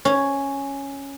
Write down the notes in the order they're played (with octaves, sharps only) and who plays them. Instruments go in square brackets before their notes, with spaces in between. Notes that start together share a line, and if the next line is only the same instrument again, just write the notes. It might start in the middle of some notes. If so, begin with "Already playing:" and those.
[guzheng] C#4